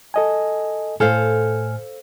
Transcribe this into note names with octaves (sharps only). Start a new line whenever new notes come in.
A4 D#5 G#5
A2 A4 C5 F5 G#5 F6